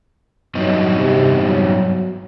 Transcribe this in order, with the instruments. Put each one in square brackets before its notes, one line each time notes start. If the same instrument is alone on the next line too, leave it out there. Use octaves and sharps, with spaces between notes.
[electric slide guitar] G2 B3 D#4 [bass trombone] F#3
[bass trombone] C3
F#3